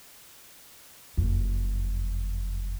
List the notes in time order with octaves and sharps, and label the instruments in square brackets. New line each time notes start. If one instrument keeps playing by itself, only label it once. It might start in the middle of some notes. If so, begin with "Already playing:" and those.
[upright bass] F#1 F2